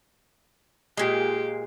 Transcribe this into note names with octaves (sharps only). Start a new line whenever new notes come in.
A#2 G#3 G4